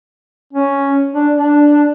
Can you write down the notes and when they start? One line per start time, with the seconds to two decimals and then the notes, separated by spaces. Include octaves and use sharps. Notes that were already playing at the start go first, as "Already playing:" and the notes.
0.53 C#4
1.14 D4
1.36 D4